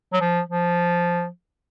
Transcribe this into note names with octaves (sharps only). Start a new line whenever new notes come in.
F#3
F3
F3